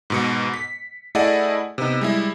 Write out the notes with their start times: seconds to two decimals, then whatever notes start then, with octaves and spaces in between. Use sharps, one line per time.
0.10 G#2 B2 C#7
0.54 B6
1.15 A3 E4 G#4 D5 D#5 F#5
1.78 C3 B3 D#4
2.01 G3 G#3 E4